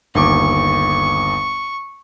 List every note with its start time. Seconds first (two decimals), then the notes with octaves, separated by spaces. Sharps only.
0.15 G1 D#2 C#6 D6